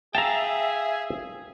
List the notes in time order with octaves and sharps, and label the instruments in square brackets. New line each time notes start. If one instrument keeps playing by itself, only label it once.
[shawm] G#4 [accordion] E5 [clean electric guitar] F5 G5 [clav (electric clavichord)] A5 A#5